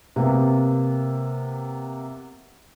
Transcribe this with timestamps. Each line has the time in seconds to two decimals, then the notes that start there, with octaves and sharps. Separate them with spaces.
0.16 C3 A#3 B3